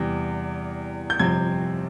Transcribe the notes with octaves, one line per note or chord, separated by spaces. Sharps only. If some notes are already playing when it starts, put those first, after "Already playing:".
Already playing: E2 C3 G3
G6
G1 F2 C3 F3 C4 G#6